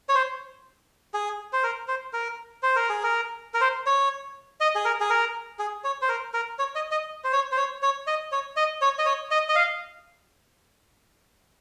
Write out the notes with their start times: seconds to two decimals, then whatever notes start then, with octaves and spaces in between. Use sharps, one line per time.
0.09 C#5
0.15 C5
1.14 G#4
1.53 C5
1.63 A#4
1.88 C5
2.13 A#4
2.63 C5
2.76 A#4
2.89 G#4
3.03 A#4
3.54 A#4
3.61 C5
3.86 C#5
4.60 D#5
4.75 G#4
4.85 A#4
5.00 G#4
5.10 A#4
5.59 G#4
5.84 C#5
6.02 C5
6.09 A#4
6.34 A#4
6.59 C#5
6.75 D#5
6.91 D#5
7.24 C5
7.33 C#5
7.52 C5
7.57 C#5
7.82 C#5
8.07 D#5
8.32 C#5
8.56 D#5
8.81 C#5
8.98 D#5
9.06 C#5
9.31 D#5
9.49 D#5
9.56 F5